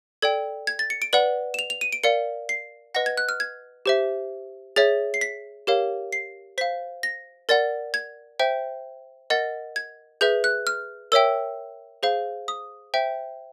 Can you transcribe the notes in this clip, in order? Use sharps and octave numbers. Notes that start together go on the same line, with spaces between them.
A4 D5 G5 G#6
G#6
A6
C#7
D7
B4 D5 F#5 F#7
E7
F7
F7
D#7
D7
A#4 D5 F5 C#7
C7
B4 D#5 F#5 A#6
G#6
F#6
F6
G#6
G4 C5 E5
G#4 C#5 E5 A6
C7
B6
G4 A#4 C#5 F5
C7
C5 F5 B6
A#6
A#4 D5 F#5 A6
G#6
C5 E5 G5
A#4 D#5 F#5 A6
G#6
G#4 B4 E5 G6
F#6
F6
A#4 C#5 E5 G5 E6
G#4 C5 F5
D#6
C5 E5 G5